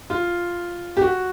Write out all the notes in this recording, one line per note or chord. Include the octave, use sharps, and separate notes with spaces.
F4
G4
F#4